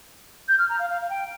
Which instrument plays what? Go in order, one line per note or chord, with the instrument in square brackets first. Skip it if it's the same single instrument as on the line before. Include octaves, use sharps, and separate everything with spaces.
[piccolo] G6
F6
A#5
F5
F5
F5
G5